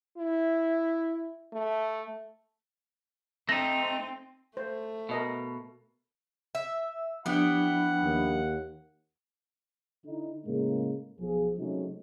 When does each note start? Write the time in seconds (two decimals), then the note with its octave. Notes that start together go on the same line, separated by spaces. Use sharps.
0.17 E4
1.53 A3
3.49 A3 C4 D#4 A#6
4.57 A3 C5
5.09 B2 A#4 D#5 E5
6.55 E5
7.26 F3 B3 D4 E4 G4 F#5
8.03 D#2
10.05 D3 D#4 E4
10.46 A2 C#3 G#3 A#3
11.20 B1 F3 G#4
11.57 C3 F#3 G#3 A3 C#4 D#4